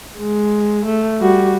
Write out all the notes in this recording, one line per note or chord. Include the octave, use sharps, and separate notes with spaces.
G#3
A3
G3 F#4